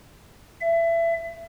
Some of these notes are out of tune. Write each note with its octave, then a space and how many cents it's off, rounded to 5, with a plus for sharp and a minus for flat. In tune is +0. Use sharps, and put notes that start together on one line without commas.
E5 +25